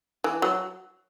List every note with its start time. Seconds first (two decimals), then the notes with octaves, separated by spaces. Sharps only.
0.24 E3
0.42 F#3